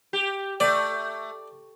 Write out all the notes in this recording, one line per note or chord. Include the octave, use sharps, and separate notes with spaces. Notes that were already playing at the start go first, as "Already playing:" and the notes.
G4
A3 D5